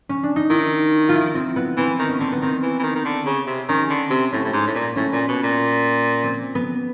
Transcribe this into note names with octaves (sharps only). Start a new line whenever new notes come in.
C#4
D4
D#4
D#3 E4
E4 F4
C4
B3
E3 C4
D#3
C#4
D3 C4
B3
D#3 C4
E3
E3
D#3
D#3
D3
C#3
C3
D#3 C#4
D3
C3
A2 C#4
A2
G#2
A2
A#2
A2 C#4
A#2
B2
A#2
C4
B3